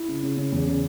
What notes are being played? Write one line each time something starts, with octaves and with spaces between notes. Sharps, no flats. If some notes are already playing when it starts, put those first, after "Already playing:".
Already playing: E4
C#3
C#3
C#3
E2
C#3